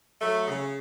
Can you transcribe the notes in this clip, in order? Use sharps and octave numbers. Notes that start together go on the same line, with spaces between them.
F#3 A3
C#3